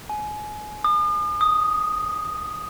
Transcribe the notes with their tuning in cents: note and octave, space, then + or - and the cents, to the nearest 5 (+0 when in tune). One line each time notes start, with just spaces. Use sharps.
G#5 +25
D#6 -45
D#6 +0